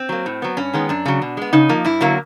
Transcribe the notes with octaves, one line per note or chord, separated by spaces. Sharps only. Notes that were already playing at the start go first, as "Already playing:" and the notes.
Already playing: C4
F#3 A#3
A2
F#3 B3
G2 C#4
D#3 G#3 B3
F#2 D4
C#3 F#3
B2
G#3 B3
C#3 D#4
F3 A#3
G2 E4
D3 F#3 A#3